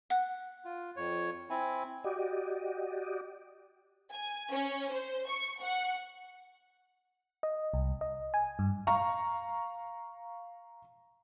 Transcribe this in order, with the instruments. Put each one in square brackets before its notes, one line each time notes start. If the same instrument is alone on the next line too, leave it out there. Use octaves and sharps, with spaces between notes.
[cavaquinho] F#5
[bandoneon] F4
F2 C#5
C4 E4 G#5
[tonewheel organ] F#4 G4 D5 D#5
[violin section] G#5
C#4
C5
C#6
F#5
[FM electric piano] D#5
C2
D#5
G#5
G2
[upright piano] F5 A#5 C#6